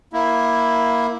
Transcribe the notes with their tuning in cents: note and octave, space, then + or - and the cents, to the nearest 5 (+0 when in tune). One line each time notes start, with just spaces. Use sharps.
A#3 +10 E4 +0